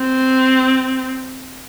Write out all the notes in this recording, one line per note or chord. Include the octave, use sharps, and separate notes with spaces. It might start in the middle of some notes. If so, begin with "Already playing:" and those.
Already playing: C4